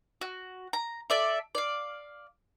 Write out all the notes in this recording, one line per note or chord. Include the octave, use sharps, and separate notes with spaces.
F#4
A#5
A4 D5 E5
D5 F5